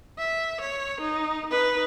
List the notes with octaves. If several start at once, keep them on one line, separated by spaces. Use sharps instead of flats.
E5
C#5
D#4
D#4 B4